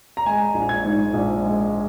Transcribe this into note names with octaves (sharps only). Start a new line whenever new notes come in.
A#5
G#3 G#5
A#1
G#6
G#2
A#1
G#3